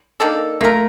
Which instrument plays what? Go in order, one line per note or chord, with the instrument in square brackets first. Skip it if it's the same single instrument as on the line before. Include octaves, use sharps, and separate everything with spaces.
[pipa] D#3 A#3 D4 A4
[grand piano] A3 [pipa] A#3
[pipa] F4 A#4